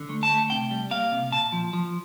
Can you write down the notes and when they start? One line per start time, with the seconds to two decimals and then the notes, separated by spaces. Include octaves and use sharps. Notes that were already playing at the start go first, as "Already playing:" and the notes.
Already playing: D3
0.09 A3
0.23 A5
0.29 A3
0.50 C3 G5
0.71 G3
0.91 A#3 F5
1.12 C3
1.32 A#2 A5
1.52 F3
1.73 F3